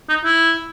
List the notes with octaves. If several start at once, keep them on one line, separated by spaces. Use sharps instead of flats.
D#4
E4